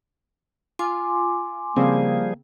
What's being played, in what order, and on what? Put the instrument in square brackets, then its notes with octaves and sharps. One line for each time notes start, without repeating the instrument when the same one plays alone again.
[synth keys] F4 [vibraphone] G#5 C6 D6
[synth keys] C#3 C4 [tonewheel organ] F3 G3 G#4 [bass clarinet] A#3